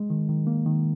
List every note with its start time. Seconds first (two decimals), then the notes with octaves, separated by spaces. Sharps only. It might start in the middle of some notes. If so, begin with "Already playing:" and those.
Already playing: G#3
0.10 D#3
0.29 D#3
0.47 A#3
0.66 D#3